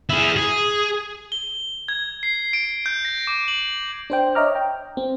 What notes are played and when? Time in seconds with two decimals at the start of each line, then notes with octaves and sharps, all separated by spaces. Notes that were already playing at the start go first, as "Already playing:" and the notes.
0.10 E4 G#4
0.37 G#4
1.32 G7
1.88 G#6
2.23 C7
2.53 D7
2.86 G6
3.05 A#6
3.27 D6
3.48 F#7
4.10 D4 C5 G5
4.35 C#5 D#5 E5 A#5 D6 F6
4.55 G5
4.97 C4